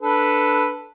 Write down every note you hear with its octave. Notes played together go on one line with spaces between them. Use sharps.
D4 A4 B4